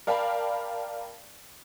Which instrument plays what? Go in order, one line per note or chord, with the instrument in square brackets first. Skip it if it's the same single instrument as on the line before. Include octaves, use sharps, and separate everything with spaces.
[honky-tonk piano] A#4 D5 F5 G5 A5 B5